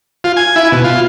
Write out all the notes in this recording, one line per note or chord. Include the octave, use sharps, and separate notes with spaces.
F4
G#5
E4
B2
F4